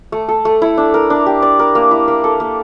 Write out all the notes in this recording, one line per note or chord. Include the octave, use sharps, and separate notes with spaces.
A3
A4
A3
E4
D4
A#4
D4
G4
D5
A#4
A#3
E4
A#3
A4
A#3